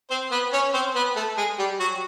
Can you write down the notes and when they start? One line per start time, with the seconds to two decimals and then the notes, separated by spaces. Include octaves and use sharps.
0.10 C4 C5
0.31 B3 B4
0.53 C#4 C#5
0.74 C4 C5
0.95 B3 B4
1.16 A3 A4
1.37 G#3 G#4
1.58 G3 G4
1.80 F#3 F#4